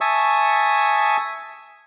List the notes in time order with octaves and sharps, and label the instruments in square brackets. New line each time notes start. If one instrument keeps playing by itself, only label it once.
[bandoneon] E5 G#5 A5 C#6 D#6 E6